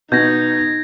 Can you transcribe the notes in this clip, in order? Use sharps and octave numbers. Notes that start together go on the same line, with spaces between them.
B2 D#4 G6 G#6 A#6